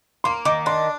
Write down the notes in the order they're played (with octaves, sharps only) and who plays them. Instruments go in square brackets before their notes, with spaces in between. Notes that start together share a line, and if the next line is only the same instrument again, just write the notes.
[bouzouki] A#3 [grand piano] C6
[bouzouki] D#3 [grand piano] D6
[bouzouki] D4 [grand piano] C6